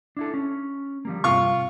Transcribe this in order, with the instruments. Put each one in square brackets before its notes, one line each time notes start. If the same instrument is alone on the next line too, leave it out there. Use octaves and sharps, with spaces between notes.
[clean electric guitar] D4 E4 A4
C#4
F3 G3 A#3
[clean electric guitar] G2 C3 [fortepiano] F4 F5 C#6